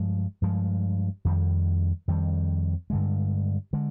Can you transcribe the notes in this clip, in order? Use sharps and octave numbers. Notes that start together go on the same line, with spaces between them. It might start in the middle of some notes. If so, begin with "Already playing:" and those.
Already playing: G2 F3 G#3
G2 F3 G#3
F2 D#3 G3
F2 D#3 G3
G2 D3 G#3
D3 G#3